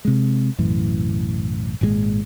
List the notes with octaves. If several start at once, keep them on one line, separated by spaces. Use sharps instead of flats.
C3 G#3
B1 F#2 A2 E3
G#1 A#2 D#3 G#3